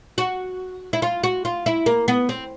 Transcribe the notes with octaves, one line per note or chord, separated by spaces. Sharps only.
F#4
E4
F4
F#4
F4
E4
A#3
B3
C4